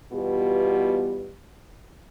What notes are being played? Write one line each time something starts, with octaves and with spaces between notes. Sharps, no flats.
E2 B2 G3 B3 F4 G4